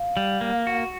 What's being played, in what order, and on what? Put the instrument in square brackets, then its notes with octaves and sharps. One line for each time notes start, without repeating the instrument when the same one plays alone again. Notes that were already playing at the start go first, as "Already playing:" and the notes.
Already playing: [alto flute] F5
[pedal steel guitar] G3
A#3
F#4